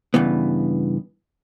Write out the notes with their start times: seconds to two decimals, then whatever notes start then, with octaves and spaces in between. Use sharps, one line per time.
0.14 G2 C#3 E3 B3